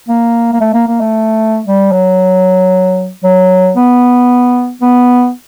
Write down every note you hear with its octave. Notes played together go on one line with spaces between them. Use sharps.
A#3
A#3
A3
A#3
A#3
A3
G3
F#3
F#3
B3
B3